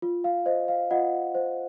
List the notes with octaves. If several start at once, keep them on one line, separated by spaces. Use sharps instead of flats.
F4
F5
C5 D#5
F5
F4 D#5 F#5
C5